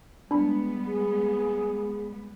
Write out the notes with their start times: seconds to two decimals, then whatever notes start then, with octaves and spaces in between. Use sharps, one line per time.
0.31 G3 G#3 B3 D4 B5
0.86 G#4